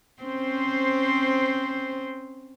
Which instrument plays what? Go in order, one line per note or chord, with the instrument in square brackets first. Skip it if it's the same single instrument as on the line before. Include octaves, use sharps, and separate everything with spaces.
[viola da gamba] C4 C#4 C5